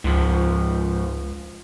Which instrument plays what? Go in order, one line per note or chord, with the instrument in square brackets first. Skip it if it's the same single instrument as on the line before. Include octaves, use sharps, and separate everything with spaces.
[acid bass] C#2 [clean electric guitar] G#2 F3